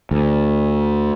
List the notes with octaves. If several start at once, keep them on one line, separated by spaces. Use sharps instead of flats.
D2